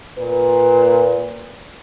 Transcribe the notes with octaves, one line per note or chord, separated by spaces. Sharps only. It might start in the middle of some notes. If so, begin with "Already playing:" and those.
A#2 B4